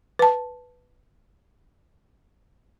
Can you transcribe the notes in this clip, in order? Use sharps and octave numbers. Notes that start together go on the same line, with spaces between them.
B4 A5